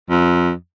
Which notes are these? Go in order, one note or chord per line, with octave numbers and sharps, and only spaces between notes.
F2